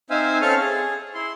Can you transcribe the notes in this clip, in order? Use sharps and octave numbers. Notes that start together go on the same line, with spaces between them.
C4 D#4 C5 E5 F5 G#5
C4 C#4 A4 F5 C#6 F6
G#4
E4 C6